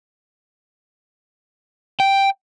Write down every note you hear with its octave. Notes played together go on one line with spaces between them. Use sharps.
G5